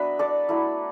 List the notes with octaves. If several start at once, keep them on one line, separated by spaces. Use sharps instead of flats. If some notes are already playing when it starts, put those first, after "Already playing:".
Already playing: F#3 B3 D4 B4 E5
A4 D5
F#3 A3 E4